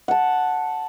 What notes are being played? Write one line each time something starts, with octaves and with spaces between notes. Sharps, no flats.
F#5 A5